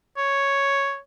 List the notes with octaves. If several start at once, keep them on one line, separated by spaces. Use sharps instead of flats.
C#5